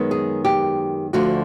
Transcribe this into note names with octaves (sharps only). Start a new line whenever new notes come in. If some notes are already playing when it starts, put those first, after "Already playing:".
Already playing: F#2 D#3 G#3 B3
G#4
G4
D2 D3 F3 F#4